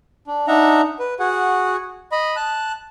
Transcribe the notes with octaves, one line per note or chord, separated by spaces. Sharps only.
D4
D4 D#4 E5 F#5 A#5
B4
F#4 G#4 F#5
D#5 B5
A5 F#6